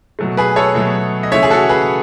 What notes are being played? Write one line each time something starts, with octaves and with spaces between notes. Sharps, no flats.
B2 F#3 A3
G#4 B4
A4 C#5
B2 F#3 A3
D#5
C#3 E3 A3 C#5 E5
G#4
F#4 A4
G#4 B4